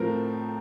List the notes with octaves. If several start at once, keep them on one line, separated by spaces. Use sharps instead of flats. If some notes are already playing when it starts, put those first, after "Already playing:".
Already playing: A2 F3 C4 A#4